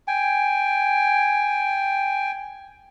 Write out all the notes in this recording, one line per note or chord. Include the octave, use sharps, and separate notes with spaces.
G5 G#5